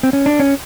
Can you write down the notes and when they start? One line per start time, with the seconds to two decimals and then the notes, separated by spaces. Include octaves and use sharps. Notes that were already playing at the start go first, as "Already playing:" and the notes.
0.03 C4
0.13 C#4
0.26 D4
0.40 C#4